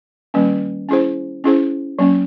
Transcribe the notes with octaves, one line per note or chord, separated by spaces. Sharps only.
D#3 G3 A#3 C#4
C#4 E4 G#4 C5
C#4 E4 G#4 C5
F#3 A#3 C#4